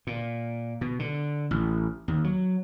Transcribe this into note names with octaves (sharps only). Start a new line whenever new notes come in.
A#2
B2
D3
A1
D#2
F#3